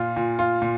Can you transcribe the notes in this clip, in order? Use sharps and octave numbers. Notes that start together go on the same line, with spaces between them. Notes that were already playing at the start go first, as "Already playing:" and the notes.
Already playing: A#2 F4
A#2
F4
A#2